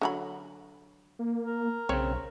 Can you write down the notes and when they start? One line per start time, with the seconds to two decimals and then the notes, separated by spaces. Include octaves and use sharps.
0.01 D3 F#3 B5
1.19 A#3
1.45 A#4
1.89 B1 C#3 C4 C#5